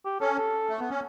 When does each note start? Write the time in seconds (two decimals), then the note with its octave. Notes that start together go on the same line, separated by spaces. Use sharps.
0.05 G4
0.20 C#4 A4
0.38 A4
0.70 A3
0.79 B3
0.90 C#4